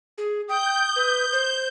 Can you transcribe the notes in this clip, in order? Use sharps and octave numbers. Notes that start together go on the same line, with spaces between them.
G#4
G5 D#6 G6
B4
C5